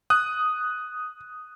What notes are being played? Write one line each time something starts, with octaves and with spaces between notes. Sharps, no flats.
D#6 F#6